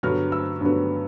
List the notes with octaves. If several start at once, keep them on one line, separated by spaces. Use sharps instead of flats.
G2 D3 F#3 B3 F6
E6
G2 D3 F#3 B3